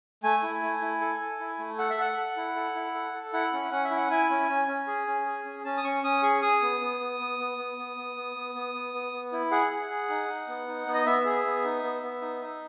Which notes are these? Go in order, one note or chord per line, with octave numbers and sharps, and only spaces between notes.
A3 G#5
E4
A3
E4
A4
A4
E4
A3
A4 F#5
E5
A4 F#5
A4
E4
A4
E4
A4
A4
E4 F#5
C#4
C#4 F#5
E5
E4
F#5
E4 G#5
C#4
C#4
C#4
G#4
C#4
G#4
C#4
C#4 A5
D#6
C#4 C#6
C#4 D#6
G#4 C#6
G#4 D#6
B3
B3
B3
B3
B3
B3
B3
B3
B3
B3
B3
B3
B3
B3
E4
G#4 F#5
G#4
G#4
D#4
D#4
B3
D#4
B3
D#5
B3 E5
G#4
B3
D#4
B3
B3
D#4
D#4